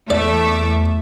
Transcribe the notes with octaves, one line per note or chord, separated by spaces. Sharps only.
E2 A3 D5 E5 D6